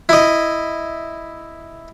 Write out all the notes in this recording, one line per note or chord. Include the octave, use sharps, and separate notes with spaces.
E4 D#5